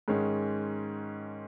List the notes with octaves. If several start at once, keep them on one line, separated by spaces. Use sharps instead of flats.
G#2 D#3 G#3 C#4